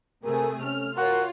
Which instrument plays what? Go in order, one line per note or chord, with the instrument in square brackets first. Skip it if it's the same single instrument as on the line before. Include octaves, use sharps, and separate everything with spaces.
[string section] C3 A3 G#4 [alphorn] A#4
[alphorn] C#4 [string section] F6
[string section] F4 C#5 [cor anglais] F#4 [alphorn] A#4